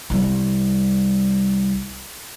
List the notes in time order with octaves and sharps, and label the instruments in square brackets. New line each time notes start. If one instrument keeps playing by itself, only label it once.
[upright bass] C2 G3